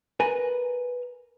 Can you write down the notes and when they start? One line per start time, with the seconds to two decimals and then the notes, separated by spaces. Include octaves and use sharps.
0.20 A#4 B4 G#5